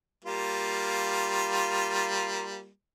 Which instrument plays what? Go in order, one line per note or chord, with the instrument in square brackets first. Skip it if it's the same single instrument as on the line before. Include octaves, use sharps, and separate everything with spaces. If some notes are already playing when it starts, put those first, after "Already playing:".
[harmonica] G3 A#3 F4